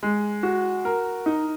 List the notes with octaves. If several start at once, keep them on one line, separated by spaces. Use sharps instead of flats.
G#3
F#4
A#4
D#4